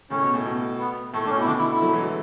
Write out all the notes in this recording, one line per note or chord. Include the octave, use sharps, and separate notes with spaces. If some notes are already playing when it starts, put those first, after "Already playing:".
A2 C#3 C#4
B2
A2
B2
B3
A2 A3
A2 D4
C#4
B2
E4
B2 D3 D4
E4
E4
F#3 A3
E3 G#3
E3 G#3